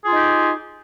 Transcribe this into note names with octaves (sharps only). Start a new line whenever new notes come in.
D#4 F4 G4 G#4